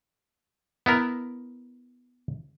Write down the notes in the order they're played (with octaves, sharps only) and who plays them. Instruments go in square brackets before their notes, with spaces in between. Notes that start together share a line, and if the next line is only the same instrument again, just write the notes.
[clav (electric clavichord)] B3 E4 A#4